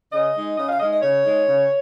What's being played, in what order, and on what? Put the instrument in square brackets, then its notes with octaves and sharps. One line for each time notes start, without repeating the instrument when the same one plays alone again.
[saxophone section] C#3 D#5
G#3 D#4
C#3 D#5
F5
G#3 D#5
D#4
D#5
C#3 C#5
G#3 D#4
C#3